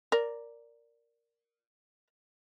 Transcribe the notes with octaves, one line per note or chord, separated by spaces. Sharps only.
A#4 D5